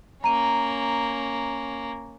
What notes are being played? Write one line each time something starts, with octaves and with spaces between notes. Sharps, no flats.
A#3 C#4 A#5 D#7